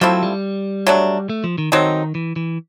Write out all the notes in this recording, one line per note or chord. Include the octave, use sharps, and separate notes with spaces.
F3 F#3 A3 C4 E4
G3
F#3 A3 D4
A3
F3
D#3
D#3 F#3 A3 C4 D#4
E3
E3